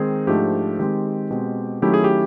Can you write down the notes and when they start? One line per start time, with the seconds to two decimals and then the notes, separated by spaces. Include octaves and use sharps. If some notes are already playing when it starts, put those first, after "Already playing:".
Already playing: D#3 G#3 C4 D#4 G#4
0.27 G#2 F3 A3 D4 G4
0.79 D#3 G#3 C4 G4
1.31 B2 G#3 C4
1.82 D#3 F#3 A3 C#4 E4 G4
1.94 G#4
2.04 G4